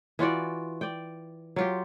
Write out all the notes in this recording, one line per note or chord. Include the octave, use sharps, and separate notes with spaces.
E3 F4 F#4 D5
D5 G5
F#3 F4 G4